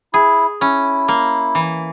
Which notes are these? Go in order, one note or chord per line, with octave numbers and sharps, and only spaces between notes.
E4 G#4
C#4 E4
A#3
E3